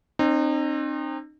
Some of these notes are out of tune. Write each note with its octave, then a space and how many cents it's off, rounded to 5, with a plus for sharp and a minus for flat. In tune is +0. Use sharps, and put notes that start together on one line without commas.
C4 +30 D#4 -35